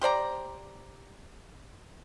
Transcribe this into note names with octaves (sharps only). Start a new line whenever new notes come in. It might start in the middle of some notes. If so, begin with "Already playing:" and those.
G4 C5 D5 A#5